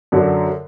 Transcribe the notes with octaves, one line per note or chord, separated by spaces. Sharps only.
F#2 D3 F#3